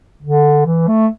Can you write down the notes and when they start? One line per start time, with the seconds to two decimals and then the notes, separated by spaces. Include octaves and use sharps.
0.22 D3
0.66 E3
0.88 A3